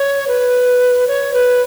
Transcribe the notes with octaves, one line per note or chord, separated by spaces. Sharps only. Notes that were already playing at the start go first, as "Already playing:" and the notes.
Already playing: C#5
B4
C#5
B4